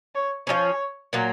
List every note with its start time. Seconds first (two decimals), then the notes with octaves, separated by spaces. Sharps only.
0.15 C#5
0.47 F3 G#3 C#4 C#5
1.13 A#2 F#3 A#3